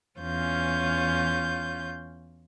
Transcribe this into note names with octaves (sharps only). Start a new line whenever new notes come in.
E2 C#4 F4 G6